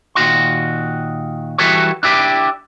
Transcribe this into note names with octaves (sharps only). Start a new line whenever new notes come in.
A#2 D#3 F#4 C6
E3 G3 F#4 A4 B4 C#5
D4 E4 G4